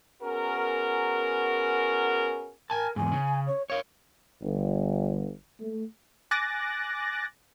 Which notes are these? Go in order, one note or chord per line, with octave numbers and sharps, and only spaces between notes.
B3 C#4 F#4 G#4 A#4
A#4 G#5 A5
E2 G#2 G#5
C#3
C#5
A#4 C#5 F5
G1
A3
G#5 D6 F#6 A6 A#6